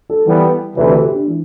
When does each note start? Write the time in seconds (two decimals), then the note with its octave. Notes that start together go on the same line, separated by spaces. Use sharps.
0.10 A4
0.27 E3 G3 B3
0.76 D2 C3 E3 B4
0.90 A4
1.03 G4
1.14 D4
1.28 E3